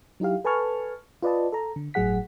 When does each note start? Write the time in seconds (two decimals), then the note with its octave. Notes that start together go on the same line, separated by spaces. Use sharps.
0.20 F#3 D#4 E4 G4 F5
0.45 A4 B4 G#5 A5 C#6 F6
1.23 F4 B4 D5 D#5 A5
1.53 A4 A#5
1.76 D3
1.94 G1 A2 F#3 G#4 F#5 B6